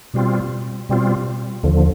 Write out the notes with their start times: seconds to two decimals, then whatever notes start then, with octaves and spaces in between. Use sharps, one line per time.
0.14 B2 G3 C4 F4
0.89 B2 G3 C4 F4
1.63 D#2 D3 F3